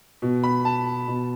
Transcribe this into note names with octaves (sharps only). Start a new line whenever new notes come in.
B2
B5
A5
B2